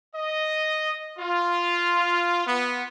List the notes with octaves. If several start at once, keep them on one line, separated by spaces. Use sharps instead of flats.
D#5
F4
B3